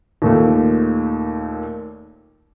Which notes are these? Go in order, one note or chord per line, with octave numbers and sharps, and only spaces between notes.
D#2 A#2 A3